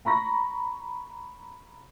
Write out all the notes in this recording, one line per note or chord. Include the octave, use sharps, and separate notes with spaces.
A#5 B5 C#6 A#6